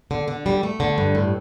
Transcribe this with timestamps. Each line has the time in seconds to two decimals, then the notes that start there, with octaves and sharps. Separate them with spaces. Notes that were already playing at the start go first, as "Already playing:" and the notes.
0.11 D3
0.28 D3
0.46 G3
0.63 A3
0.80 D3
0.98 G2
1.15 A2